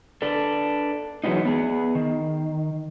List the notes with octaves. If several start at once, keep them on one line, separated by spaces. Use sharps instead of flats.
D4 A4 B4
E3 F#3 G#3 B3 D#4
B3 G#4
D#3